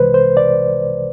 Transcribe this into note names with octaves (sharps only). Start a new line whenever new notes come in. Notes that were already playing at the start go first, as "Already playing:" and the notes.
Already playing: C2 C3 E3 G#3 B4 C5
C5
D5